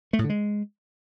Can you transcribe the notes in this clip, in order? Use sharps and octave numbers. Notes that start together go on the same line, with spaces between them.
A3
A2
D3
G#3